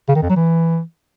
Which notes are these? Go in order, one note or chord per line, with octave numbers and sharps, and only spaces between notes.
C#3
D#3
F2
F#3
E3